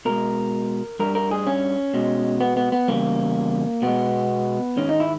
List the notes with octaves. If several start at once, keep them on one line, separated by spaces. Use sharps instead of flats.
B2 G#3 A#4
G2 G3 A#4
A#4
G#4
C#4
B2 G#3
B3
B3
B3
E2 C#3 G3 A#3
B2 G#3 B3
G#2 D#3 G#3 C#4
D#4
E4